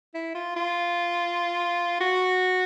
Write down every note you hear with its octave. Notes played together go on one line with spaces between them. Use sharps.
E4
F4
F4
F#4